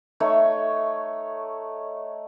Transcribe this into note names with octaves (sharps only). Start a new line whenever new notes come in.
A3 D#4 C#5